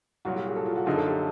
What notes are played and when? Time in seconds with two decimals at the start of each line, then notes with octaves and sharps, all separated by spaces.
0.25 C2 A#2 F#3 F#4
0.36 G4
0.45 G#4
0.56 A4
0.66 F4
0.76 F#4
0.86 F#2 D3 F3 A#3 D#4 G#4
0.97 A4
1.07 G4